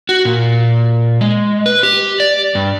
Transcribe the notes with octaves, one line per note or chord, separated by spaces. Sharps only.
F#4
A#2
G#3
B4
G4
D5
G2